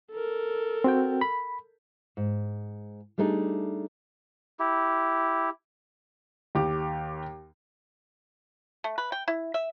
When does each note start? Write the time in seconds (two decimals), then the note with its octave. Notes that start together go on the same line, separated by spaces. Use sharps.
0.12 A4 A#4
0.84 C4 F#4 G5
1.21 B5
2.17 G#2
3.18 G3 A3 D4 D#4 G#4
4.60 E4 G4
6.55 D#2 G4 D6
8.84 A3
8.98 B4
9.12 G5
9.28 E4
9.54 E5